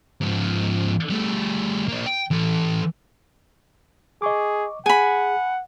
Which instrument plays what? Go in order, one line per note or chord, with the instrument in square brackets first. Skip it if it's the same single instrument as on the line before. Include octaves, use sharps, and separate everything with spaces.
[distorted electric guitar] G#2 F3
G3 A3
A#3 D4
G5
E3 A4
[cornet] G#4 [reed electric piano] D#5 C#6 D6
[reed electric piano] G#4 [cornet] F#5 [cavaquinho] G#5 B5